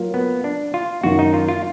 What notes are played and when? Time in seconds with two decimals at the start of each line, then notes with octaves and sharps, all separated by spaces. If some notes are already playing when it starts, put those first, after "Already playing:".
Already playing: F#3 A#3 F4
0.14 B3
0.44 D4
0.74 F4
1.04 F#2 D#3 A#3 F#4
1.19 D#4
1.34 F4
1.48 F4